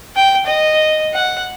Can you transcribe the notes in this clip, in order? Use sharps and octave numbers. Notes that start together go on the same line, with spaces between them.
G5
D#5
F#5